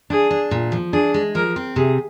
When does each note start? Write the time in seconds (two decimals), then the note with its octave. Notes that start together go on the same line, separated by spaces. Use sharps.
0.10 D4 G#4
0.31 D4
0.51 A#2
0.72 F3
0.93 D4 G#4
1.14 G#3
1.35 F3 A#4
1.56 C4
1.76 C3 G#4